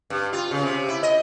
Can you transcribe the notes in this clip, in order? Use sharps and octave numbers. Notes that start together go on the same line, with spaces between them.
G2
F4
C#3
C3
E4
D#5